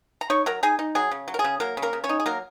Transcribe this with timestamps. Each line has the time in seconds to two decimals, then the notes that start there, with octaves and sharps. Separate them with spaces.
0.21 A#5
0.30 D#4 C#5 C#6
0.46 F#3 A#4 A#5
0.63 D#4 G#4 G#5
0.79 D#4
0.95 F#3 G#4
1.11 C#3
1.28 F#3
1.34 A#4
1.39 G#4
1.44 C#3
1.60 F#3 A#3 A#4
1.77 C#3
1.82 A#3 A#4
1.93 C#3
2.04 C#4 C#5
2.09 D#4
2.20 G#4
2.26 F#3 A#3 A#4